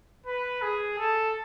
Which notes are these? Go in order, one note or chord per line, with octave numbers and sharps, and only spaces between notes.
B4
G#4
A4